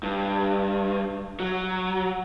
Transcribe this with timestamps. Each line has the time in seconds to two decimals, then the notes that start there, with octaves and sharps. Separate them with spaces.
0.03 G2
1.40 F#3